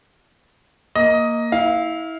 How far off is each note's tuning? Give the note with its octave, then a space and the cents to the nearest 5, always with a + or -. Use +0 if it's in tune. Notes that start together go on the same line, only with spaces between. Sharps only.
A#3 +0 D#5 +10
E4 -25 F5 +0